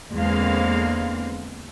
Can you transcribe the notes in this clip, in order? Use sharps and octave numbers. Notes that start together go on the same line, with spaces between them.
E2 D3 G#3 A#3 C4 F5